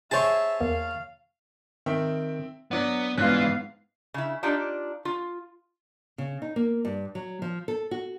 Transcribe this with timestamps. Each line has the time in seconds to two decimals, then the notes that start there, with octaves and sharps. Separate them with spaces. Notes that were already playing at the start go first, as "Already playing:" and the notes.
0.11 G#4 C5 C#5 E5 A5
0.61 E2 A#3 F5
1.86 D#3 C4 E5 G5
2.71 F#3 B3 D4 D5 F#5
3.18 G#2 E3 B3 C#4 D4 F4 F5 F#6
4.14 C#3 E4
4.43 D4 D#4 F4 G4 D5
5.05 F4
6.18 C#3
6.42 D#4
6.56 A#3
6.85 G2
7.15 F#3
7.42 F3
7.68 A4
7.91 F#4